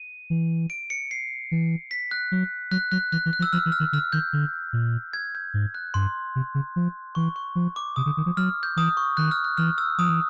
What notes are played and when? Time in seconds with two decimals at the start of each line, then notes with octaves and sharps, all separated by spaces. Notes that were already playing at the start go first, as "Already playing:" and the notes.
Already playing: D#7
0.30 E3
0.70 D7
0.90 C#7
1.11 C7
1.51 E3
1.91 B6
2.11 F#6
2.32 F#3
2.71 F#3 F#6
2.92 F#3 F#6
3.12 E3 F#6
3.26 E3
3.33 F#6
3.39 F3
3.42 E6
3.53 F3 F6
3.66 E3
3.72 F6
3.80 D#3
3.93 D3 F6
4.12 D#3 G6
4.33 D3
4.73 A#2
5.13 G#6
5.35 G6
5.54 G#2
5.75 F#6
5.94 G2 C6
6.36 C3
6.55 C#3
6.76 F3
7.15 E3 C#6
7.36 C#6
7.55 F3
7.76 D6
7.96 C3 D#6
8.06 D3
8.17 D#3
8.26 F3
8.37 F#3 F6
8.63 G6
8.76 E3 D#6
8.97 C#6
9.17 D#3 F#6
9.31 F6
9.44 F#6
9.57 E3 F6
9.78 E6
9.98 F3 D#6
10.09 E3